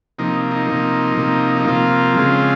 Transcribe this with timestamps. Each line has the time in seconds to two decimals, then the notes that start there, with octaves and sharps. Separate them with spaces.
0.19 C3 F3 A#3 D#4
0.51 D#4
0.67 C3 F3 A#3
1.17 C3 F3 A#3
1.56 D#4
1.65 C3 F3 A#3 F4
2.15 C#3 F3 G#3 C4